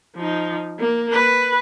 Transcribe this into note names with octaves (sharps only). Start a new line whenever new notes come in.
F3 D#4
A#3
B4